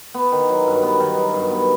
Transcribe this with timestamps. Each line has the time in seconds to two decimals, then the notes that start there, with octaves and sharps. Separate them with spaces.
0.14 B3
0.32 D#3
0.49 F#3
0.67 G2
0.83 B3
1.00 D#3
1.17 F#3
1.34 G2
1.51 B3